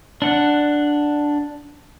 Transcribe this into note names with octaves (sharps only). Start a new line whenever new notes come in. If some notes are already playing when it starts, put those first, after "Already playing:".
D4 F#5